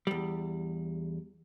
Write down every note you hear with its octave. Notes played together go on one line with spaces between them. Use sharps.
E2 G3